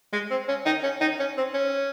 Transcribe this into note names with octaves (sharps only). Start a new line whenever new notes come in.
G#3
C4
C#4
D#4
C#4
D#4
C#4
C4
C#4